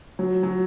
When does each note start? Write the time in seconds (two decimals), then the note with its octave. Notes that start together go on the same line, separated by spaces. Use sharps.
0.19 F#3
0.43 F#3